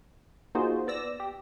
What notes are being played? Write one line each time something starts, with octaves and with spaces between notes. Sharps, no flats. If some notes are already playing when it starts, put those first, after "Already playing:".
A#3 D#4 F4 F#4 G#4 C5
B3 D5 E6 A#6
G4